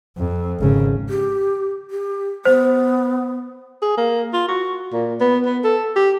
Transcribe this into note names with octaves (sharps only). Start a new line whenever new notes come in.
F2
G#1 C#3
G4
G4
B3 C5
G#4
A#3
F4
F#4
A#2
B3
B3
A4
G4